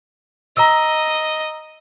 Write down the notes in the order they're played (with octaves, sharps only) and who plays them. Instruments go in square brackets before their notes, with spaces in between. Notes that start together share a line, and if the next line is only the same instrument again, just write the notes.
[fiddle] D#5 [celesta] A#5 E6